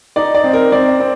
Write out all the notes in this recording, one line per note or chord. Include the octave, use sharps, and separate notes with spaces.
D#4 D5
D5
C4
A#4
C4 D5
C4